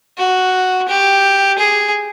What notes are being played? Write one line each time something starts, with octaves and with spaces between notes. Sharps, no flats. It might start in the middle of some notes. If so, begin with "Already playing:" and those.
F#4
G4
G#4